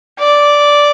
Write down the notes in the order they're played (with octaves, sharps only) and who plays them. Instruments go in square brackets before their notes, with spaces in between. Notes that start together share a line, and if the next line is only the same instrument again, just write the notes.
[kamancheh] D5